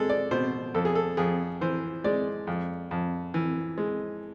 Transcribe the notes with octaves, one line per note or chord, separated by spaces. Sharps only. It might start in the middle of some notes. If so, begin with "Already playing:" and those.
Already playing: G#3 G#4 A4
D5
B2 C5
F2 A4
G#4
A4
F2 G#4
E3 C5
G#3 D5
F2
F2
E3
G#3